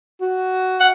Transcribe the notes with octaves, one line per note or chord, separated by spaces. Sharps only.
F#4
F#5